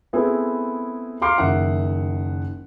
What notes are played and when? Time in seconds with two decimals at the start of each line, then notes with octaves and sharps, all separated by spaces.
0.13 A3 B3 C4 E4 G#4
1.21 F5 A#5 C6 D6 F6 C7
1.38 F#1 D#3 E5 F#5